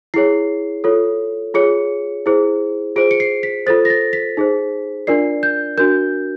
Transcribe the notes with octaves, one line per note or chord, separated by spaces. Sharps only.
E4 G#4 C#5 C7
F4 A4 C#5
F4 G#4 C#5 C#7
E4 G#4 C5
F4 G#4 C5 D7
C#7
C7
B6
F4 A4 C5 A6
A#6
A6
B6
D#4 G#4 C5
D4 F4 A#4 D5 C7
G6
D4 F#4 A#4 G6